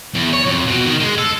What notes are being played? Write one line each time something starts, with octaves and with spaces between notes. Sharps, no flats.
E2
C#5
F2
B2
D#3
G#3
A4